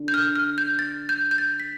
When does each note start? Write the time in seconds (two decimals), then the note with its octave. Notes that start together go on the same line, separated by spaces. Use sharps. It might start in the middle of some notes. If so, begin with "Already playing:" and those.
Already playing: D3
0.08 G6
0.14 F6
0.36 F6
0.58 G6
0.79 A6
1.09 G6
1.31 G6
1.38 A6
1.60 B6